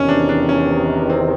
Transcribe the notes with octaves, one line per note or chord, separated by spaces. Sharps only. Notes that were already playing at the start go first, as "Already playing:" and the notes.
Already playing: E2 C3 D#3 C#4
D4
D4
C#4
C4